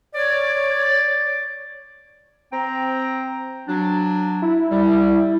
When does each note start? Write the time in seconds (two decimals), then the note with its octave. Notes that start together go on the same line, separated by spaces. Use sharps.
0.15 C#5 D5
2.51 C4 G5 A#5
3.68 F#3 D4
4.42 E4
4.70 G3